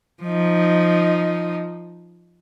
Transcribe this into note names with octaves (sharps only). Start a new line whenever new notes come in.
F3 D#4